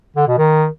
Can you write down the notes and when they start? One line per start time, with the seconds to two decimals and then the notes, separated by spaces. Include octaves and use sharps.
0.16 D3
0.27 B2
0.38 D#3